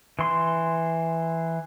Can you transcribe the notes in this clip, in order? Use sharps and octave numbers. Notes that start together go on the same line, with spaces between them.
E3 C6